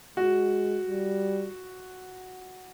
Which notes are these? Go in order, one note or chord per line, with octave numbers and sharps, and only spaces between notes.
G#3 F#4
G3